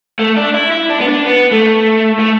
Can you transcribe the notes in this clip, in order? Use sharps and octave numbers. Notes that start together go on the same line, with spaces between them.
A3
D4
E4
E4
D4
B3
D4
B3
A3
A3